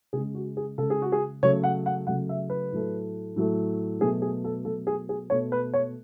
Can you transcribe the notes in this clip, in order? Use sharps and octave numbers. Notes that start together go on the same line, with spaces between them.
C#3 G#3 G#4
F#4
G#4
C#3 G#3 A4
G#4
F#4
G#4
C#3 F#3 A3 C#5
F#5
F#5
C#3 F#3 A3 F#5
E5
B4
A2 F#3 A3
A2 F#3 A3
B2 F#3 A3 G#4
G#4
A4
B2 F#3 A3 A4
G#4
G#4
B2 A3 C#5
B4
C#5